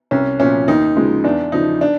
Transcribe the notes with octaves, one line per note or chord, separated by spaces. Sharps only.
C2 C#4
A#2 F3 C#4
D#2 D#4
C#3 F3 G#3
E2 D4
C#3 F3 D#4
D4